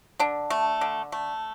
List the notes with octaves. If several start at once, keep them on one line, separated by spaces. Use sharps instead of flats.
D3 D4
A3
D3
A3